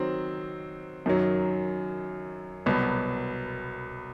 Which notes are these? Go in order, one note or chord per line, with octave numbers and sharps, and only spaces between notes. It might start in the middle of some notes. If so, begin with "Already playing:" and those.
Already playing: D#3 F#3 C4
F#2 D#3 F#3
C2 B2 F#3 B3